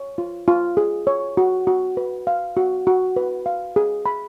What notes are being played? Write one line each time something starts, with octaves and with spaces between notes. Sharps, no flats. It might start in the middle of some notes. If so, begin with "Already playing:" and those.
Already playing: C#5
F4
F4
G#4
C#5
F#4
F#4
B4
F5
F#4
F#4
B4
F5
G#4
B5